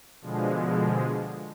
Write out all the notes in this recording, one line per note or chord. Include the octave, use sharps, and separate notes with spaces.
B2 D3 F3 G#3